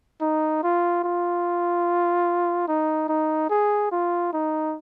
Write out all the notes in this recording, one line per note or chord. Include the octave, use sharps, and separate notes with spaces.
D#4
F4
F4
D#4
D#4
G#4
F4
D#4